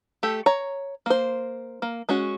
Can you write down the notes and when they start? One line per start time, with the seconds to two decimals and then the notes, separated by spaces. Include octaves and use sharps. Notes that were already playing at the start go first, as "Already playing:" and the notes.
0.23 A3 G4 A4
0.46 C#5 A#5
1.06 A#3 C5
1.82 A#3
2.09 G#3 C#4 F#4